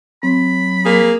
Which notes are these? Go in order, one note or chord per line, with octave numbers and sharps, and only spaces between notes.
F#3 C4 B5
A#3 G#4